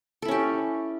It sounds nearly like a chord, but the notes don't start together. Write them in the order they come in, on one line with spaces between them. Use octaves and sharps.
A4 E4 C#4 G4